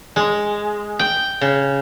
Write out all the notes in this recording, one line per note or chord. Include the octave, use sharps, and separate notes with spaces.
G#3
G5
C#3